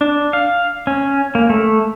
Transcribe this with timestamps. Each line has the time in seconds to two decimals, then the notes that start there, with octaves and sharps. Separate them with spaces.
0.01 D4
0.33 F5
0.87 C#4
1.35 A#3
1.50 A3